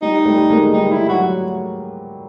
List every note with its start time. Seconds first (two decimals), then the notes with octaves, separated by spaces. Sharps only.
0.02 G3 D#4
0.26 G3 A3
0.50 G#3 A#3
0.73 G3 D#4
0.92 E4
1.09 F#3 F#4